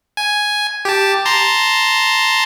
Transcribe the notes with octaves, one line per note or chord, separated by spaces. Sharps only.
G#5
G4 A5
A5 A#5 C6